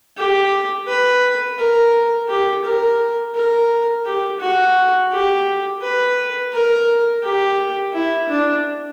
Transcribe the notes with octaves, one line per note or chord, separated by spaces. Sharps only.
G4
B4
A#4
G4
A#4
A#4
G4
F#4
G4
B4
A#4
G4
E4
D4